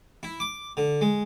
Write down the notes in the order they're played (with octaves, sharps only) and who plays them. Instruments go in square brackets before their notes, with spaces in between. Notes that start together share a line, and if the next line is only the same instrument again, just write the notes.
[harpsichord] E4
D6
D3
G#3